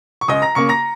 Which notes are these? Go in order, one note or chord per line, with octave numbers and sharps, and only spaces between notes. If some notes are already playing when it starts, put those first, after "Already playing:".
C#6
C#2 D#5 D#6
A#5 A#6
C#3 A#3 C#6 C#7
A#5 A#6